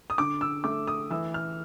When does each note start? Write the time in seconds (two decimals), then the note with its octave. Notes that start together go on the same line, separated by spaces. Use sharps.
0.10 D#6
0.18 D3 D6
0.41 E6
0.64 A3 D6
0.87 D#6
1.10 E3 E6
1.34 F6